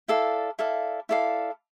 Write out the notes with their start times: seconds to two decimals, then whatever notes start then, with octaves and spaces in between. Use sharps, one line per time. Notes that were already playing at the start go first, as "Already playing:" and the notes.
0.08 E4 A4 D5 F5
0.59 E4 A4 D5 F5
1.09 E4 A4 D5 F5